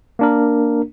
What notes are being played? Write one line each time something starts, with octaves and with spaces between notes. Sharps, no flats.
A#3 D4 A#4